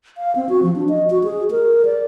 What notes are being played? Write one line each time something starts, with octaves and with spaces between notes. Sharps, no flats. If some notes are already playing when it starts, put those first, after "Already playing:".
F5
C4
F#4
F3
D4
D#5
F#4
G#4
A#4
D5